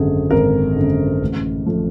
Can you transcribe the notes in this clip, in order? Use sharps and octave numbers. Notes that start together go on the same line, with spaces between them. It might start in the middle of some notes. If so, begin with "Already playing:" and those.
Already playing: G#1 F#2 D3 G#4
G#1 A#4
F#2 D3
A1
F3 A3